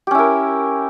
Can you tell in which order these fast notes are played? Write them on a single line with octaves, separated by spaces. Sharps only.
G4 C#4 E4 A#4